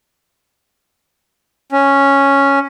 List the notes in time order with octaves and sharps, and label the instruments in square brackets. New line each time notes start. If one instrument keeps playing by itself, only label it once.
[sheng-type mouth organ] C#4